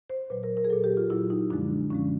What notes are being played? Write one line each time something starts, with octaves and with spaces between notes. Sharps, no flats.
C5
A#2 F#3 B4
A#4
A#4
G#4
A#2 F#3 A4
G4
F4
A#2 F#3 E4
D#4
F#2 D3 F3 G#3 D4
F#2 D3 F3 G#3 C#4